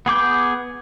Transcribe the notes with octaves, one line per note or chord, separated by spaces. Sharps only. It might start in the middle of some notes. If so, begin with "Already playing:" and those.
B3 G#4 D6 G6